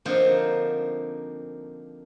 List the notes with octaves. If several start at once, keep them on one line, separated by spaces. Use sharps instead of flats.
D3 F3 A#3 C4 D#4